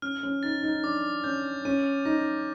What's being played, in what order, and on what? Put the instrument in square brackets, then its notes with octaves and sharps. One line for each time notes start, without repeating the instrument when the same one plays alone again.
[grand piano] C#4 [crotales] F6
[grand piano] C#4
[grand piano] D#4 [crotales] A6
[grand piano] D#4
[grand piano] D4 [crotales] D6
[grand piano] C#4 [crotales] G6
[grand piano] C#4 [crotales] D#7
[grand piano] D#4 [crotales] A#6